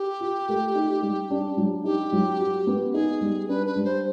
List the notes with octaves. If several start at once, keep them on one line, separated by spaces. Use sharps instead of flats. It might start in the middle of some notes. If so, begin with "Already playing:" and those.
Already playing: G4
F4
A3
D#4
G3
D4
F#3
D#4 G4
F#3
F#4
B3
D#4 G#4
G3
D4 B4
B4
G3
C5